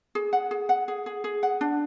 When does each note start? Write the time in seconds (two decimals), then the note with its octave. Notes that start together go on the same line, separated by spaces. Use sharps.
0.15 G#4
0.33 F#5
0.51 G#4
0.69 F#5
0.88 G#4
1.06 G#4
1.24 G#4
1.43 F#5
1.61 D4